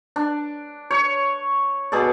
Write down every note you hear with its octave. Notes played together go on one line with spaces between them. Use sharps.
D4
C#5
B2 G#4 A4 D5